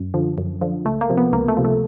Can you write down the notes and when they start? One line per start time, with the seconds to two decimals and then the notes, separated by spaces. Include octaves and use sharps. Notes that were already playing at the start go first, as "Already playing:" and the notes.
Already playing: F#2
0.14 D3 F3
0.38 F#2
0.61 D3 F3
0.85 C#2 A3
1.01 A#3
1.10 C3 F3
1.17 B3
1.33 C#2 A#3
1.48 A3
1.57 C3 F3
1.65 A3